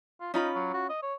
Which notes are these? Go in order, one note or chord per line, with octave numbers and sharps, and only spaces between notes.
F4
C#4 D#4 F4 B5
F#3
F#4
D#5
C#5